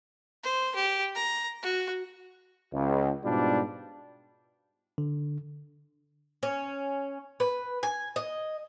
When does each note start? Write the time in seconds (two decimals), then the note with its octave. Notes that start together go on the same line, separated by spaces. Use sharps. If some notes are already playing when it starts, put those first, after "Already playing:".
0.43 C5
0.75 G4
1.15 A#5
1.62 F#4
2.73 C#2
3.24 G#2 B2 G3 D4 F4
4.98 D3
6.43 C#4
7.40 B4
7.83 G#5
8.16 D#5